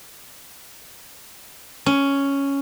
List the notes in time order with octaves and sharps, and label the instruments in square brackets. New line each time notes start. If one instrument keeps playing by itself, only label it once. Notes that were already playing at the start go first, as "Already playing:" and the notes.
[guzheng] C#4